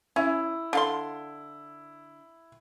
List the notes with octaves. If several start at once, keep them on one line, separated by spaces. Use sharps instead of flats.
C#4 E4
D3 F5 C6